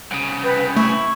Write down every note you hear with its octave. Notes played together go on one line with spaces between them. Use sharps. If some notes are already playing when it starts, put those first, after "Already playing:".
C2 C#3
B4 G5
A3 E4 C#6